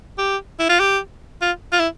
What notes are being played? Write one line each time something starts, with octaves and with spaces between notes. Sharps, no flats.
G4
E4
F4
G4
F4
F4
E4